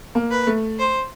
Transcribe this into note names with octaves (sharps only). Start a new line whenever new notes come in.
A#3
B4
A3
C5